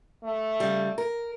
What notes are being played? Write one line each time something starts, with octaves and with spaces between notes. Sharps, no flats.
A3
C#3 G3
A#4